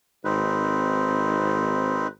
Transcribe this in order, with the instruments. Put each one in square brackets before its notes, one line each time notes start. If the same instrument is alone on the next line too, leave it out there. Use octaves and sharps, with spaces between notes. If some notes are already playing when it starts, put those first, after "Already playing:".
[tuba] G#1 [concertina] C4 D#4 B4